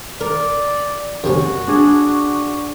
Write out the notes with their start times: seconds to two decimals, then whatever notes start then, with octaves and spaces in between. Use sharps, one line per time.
0.21 A#4 D5
1.24 F#2 C3 C#4 F#4
1.67 D4 G#4